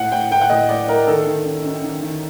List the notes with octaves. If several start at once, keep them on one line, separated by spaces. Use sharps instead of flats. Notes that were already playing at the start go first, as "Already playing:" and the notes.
Already playing: A2 F#5
A2 G5
A2 G5
F#5
A2 D#5
A2 D5
A2 A#4
D#3 A4
D#3
F#2
F#2
D#3
D#3